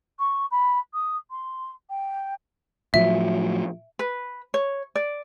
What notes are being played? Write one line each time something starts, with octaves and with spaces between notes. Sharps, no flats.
C#6
B5
D#6
C6
G5
A2 F3 F#3 E5
B4
C#5
D5